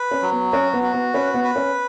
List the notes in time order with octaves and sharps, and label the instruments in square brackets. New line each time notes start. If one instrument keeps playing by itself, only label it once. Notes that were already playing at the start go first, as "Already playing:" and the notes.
Already playing: [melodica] B4
[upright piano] C#4
[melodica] F#3
[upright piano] B3
[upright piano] C#4 [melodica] F#4
[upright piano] B3
[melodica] F#4
[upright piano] B3
[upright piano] C#4 [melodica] B4
[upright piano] B3
[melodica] B4
[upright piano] C#4